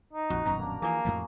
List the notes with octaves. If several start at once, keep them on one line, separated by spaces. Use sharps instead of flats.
D#4
A#1 F2 F#4
D#1 F#2 B2 A#5
A#3 D4
E3 F3 A#3 G#4
F2 A2 F3